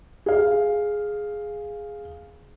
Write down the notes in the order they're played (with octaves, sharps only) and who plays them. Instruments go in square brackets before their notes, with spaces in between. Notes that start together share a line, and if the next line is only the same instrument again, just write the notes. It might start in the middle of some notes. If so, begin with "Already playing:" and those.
[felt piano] G#4 F5